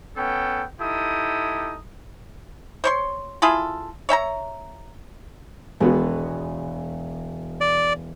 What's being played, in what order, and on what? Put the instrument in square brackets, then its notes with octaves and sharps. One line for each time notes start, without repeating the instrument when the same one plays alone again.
[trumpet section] B3 C#4 A4 G5
D#4 E4 G4 A4 D#6
[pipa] C5 C#5 C6
E4 F4 G#4 A4
C#5 E5 G5 A#5
[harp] E1 [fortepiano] G#3 B3 F#4
[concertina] D5